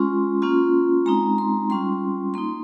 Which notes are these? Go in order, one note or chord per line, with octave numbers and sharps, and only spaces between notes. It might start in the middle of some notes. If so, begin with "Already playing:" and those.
Already playing: G#3 C#4 F4 C6
A#3 C#4 F4
G#3 C4 D#4 A#5
C6
G3 C#4 F4 C6
A#3 D#4 C6